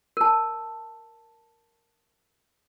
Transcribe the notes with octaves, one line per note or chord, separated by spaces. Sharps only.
A#4 A5